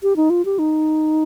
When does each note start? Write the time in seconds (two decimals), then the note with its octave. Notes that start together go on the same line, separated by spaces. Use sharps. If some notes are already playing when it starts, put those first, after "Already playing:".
0.03 G4
0.16 D#4
0.30 F4
0.45 G4
0.59 D#4